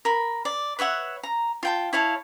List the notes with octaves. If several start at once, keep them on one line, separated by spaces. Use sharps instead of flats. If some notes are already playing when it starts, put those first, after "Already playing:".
A#4 B5
D5
B4 C#5 E5 F#5
A#5
F4 G5 A5
E4 C#5 F5 A5